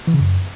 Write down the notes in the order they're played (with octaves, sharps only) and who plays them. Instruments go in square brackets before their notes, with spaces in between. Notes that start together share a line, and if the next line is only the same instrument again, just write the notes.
[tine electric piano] E3
C#3
F#2